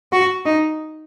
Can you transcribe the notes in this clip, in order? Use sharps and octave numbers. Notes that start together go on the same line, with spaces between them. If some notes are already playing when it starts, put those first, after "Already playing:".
F#4
D#4